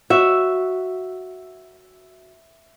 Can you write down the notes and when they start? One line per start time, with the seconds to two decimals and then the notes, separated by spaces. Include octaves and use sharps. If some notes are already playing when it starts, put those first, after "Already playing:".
0.10 F#4 E5